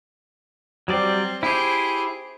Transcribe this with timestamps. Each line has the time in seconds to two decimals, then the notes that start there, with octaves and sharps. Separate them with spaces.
0.88 F#3 G3 C4 D5
1.43 E4 G4 G#4 C5